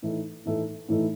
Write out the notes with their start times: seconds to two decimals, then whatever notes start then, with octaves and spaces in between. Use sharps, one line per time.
0.02 A2 E3 A3 D#4
0.45 A2 E3 A3 D#4
0.88 A2 E3 A3 D#4